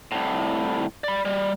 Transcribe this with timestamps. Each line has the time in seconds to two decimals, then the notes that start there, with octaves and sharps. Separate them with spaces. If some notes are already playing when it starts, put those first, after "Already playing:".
0.12 C2 A2
1.04 D5 B5
1.25 G3